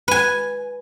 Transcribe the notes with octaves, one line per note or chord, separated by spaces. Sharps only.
B4 G#5